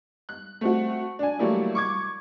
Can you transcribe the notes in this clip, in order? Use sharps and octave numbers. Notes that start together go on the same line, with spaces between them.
F#6
A3 C4 F#4
D4 G#5
E3 F#3 G3 A3 A#3 E4
C#6 D6 G#6